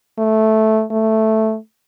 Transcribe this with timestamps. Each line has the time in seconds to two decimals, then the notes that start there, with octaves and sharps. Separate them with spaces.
0.18 A3
0.91 A3